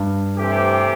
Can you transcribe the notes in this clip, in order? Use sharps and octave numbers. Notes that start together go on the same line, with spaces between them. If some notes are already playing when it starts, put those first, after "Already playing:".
Already playing: G2
C3 E3 A3 C4 G4